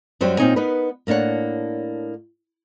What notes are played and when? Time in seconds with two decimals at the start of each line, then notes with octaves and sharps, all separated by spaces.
0.21 F#2 F#3 G3 C5 G5
0.38 A#2 F3 C4 D#4 C#5 G#5
0.56 B3 D#4 A#4 B4
1.07 A2 A#3 D4 C#5 F#5